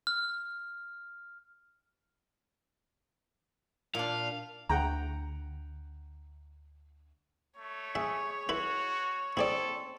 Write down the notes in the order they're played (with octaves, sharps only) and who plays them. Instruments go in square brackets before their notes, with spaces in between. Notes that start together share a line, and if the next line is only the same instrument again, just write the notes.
[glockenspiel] F6
[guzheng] A#2 D4 [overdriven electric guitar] F5
[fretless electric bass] D2 [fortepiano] F#5 G5 A#5
[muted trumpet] A3 [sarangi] C#5
[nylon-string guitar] G#4 [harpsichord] E5
[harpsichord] E4 B4 [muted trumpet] F#4
[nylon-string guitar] C4 [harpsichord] E4 G#4 D5 [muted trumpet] A4